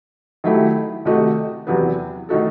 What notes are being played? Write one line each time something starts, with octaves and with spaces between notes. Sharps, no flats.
D#3 F#3 A3 E4 G4
C3 D#3 A3 D#4 F#4
E2 C3 F#3 B3
D#3 A3 D#4 F#4 A4